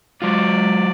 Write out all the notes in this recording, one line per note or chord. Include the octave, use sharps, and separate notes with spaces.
F#3 G#3 F4 D5